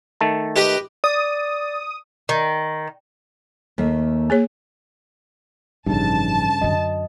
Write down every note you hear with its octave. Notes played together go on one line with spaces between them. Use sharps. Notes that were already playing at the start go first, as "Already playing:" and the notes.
D#3 A3 A5
G4 B4 D#5
D5 D#6
D#3
D#2 A3 A#3
A#3 G#4 C#5
A1 G2 C#3 F3 D#4 A5
F#2 D3 D#5